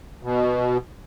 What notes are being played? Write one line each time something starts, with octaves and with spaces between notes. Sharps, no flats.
B2